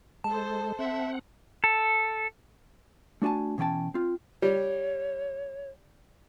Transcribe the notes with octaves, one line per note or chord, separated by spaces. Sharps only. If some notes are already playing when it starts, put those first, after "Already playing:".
G#3 A4 C5 A5
C4 E5 F#5
A4
A3 D4 F#4 G#5 A5
B2 E3 C#4 G5 A5
C4 F4
G3 C#5